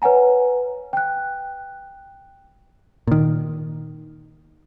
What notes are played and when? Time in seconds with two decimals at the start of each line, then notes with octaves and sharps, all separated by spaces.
0.02 B4 C#5 F#5 G#5 A#5
0.93 G5 F#6
3.07 A#2 D#3